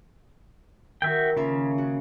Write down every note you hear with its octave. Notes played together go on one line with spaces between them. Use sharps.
D#3 F#4 E5 G5
C#3 A#3 F4 E5
F#4